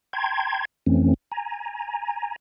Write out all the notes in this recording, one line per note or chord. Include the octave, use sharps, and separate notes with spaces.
G5 A5 A#5 C6 G#6
F2 E3 A3 C4 C#4
G#5 A#5